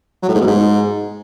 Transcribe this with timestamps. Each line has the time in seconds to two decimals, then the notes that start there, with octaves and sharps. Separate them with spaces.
0.23 F#3
0.29 A2
0.35 G#2
0.41 B2
0.47 G#2